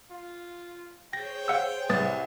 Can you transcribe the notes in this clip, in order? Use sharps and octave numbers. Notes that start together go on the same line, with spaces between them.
F4
G#4 C5 C#5 G5 A#6
F5 F#5 E6
C2 B4 D#6 A6